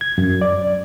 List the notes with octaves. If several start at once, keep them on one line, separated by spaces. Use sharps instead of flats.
G#6
F#2
D5